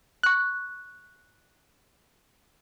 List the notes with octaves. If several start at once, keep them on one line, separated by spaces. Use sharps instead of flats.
C#6 F#6